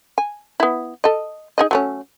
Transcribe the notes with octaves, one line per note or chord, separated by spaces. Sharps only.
G#5
B3 E4
A4 D#5
D#4 G#4 D#5
F#3 A3 C#4